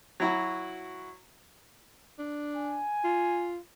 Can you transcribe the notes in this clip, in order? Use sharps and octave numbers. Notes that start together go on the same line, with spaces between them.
F#3 E4 F#4
D4
G#5
F4